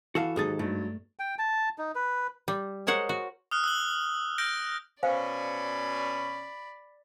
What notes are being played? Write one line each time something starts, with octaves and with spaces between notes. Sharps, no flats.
E3 F#4 A4 F5
D#2 G#2 F#3 D#4 G#4 A4 A6
G2 F#3 A3
G5
A5
D#4
B4
G3
G#3 A#4 C5 C#5 F#5
F#4
D#6 F6 F#6
E6 F#6 G7
F6 G6 A#6 D7
B2 C#4 C5 D5 F5 G#5 B5